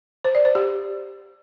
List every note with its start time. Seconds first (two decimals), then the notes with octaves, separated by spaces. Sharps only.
0.24 C5
0.35 D5
0.45 C5
0.55 G4